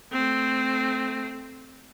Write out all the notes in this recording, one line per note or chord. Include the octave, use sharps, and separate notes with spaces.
A3 C4